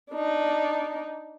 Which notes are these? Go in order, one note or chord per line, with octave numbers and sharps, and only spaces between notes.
D4 D#4